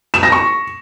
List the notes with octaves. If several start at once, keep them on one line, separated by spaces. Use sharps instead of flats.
E7
A#6
C#6